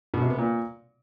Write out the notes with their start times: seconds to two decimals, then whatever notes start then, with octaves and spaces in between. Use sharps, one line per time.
0.14 B2
0.22 C3
0.30 B3
0.38 A#2